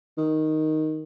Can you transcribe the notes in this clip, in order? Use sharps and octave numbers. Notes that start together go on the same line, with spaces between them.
D#3